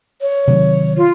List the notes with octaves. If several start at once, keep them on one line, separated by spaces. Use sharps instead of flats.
C#5
C3 D#3 F#3
F4